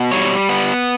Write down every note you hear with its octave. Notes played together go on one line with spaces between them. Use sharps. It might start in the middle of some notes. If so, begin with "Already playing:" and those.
Already playing: B2
G3 C#5
B3